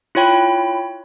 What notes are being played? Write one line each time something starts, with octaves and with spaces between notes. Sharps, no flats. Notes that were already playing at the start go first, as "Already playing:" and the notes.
E4 F4 C#5 G5 B5